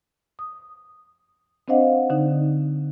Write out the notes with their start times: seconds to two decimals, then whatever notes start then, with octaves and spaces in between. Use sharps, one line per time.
0.39 D#6
1.68 C4 D4 C5 D#5 F5 F#5
2.10 D3 D#4